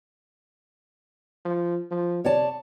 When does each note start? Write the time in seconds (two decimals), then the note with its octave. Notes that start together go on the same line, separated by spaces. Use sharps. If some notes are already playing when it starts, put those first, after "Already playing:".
1.45 F3
1.91 F3
2.25 C3 C#5 D5 A5